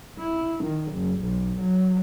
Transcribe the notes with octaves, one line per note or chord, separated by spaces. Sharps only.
E4
D#3
F#1
B1
F#3